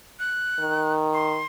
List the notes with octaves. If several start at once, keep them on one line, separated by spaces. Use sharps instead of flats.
F#6
D#3
C6